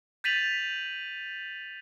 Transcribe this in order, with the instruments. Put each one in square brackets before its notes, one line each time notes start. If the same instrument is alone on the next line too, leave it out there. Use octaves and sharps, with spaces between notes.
[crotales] G6 A6 B6 D#7 F7 F#7